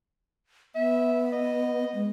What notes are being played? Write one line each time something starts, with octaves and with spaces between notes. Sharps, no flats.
B3 E5
D#5
G#3